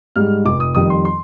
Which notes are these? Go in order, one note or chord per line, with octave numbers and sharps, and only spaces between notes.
G#2 G3 F6
F1 D6
D#6
F2 D#3 G3 D#6
C6
C6